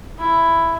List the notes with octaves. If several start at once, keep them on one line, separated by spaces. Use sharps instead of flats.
E4